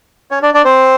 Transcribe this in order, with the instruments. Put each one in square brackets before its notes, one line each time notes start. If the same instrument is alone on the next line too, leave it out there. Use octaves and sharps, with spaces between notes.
[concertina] C#4 C#5
D4 D5
D4 D5
C4 C5